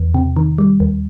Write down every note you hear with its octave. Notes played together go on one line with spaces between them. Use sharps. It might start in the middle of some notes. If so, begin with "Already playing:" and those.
Already playing: E2
C3
D#3
G3
D#2